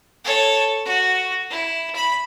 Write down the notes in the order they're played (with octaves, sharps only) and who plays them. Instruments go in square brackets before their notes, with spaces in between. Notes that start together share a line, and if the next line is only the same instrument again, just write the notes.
[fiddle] A4 C#5
F#4
E4
B5